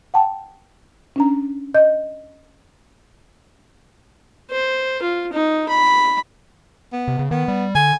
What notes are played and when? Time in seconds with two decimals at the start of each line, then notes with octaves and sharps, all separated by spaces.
0.14 F#5 G5 A5
1.16 C#4 D4 A#5
1.74 D#5 G6
4.51 C5
5.03 F4
5.33 D#4
5.69 B5
6.92 B3
7.08 C3
7.19 C#3
7.31 D#3 B3
7.48 G3
7.75 D3 G#5